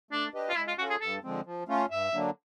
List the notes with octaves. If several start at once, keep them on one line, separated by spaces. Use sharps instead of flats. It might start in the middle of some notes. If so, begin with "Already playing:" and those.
A3 D4
D4 G4 B4 D#5
F4
G#3 E4
F4
C#4 F4 F#4 A4
G#4
G2 A4
D3 F3 G#3 C4
F3
A3 C#4 F4
G2 E5
D3 F#3 A#3 D4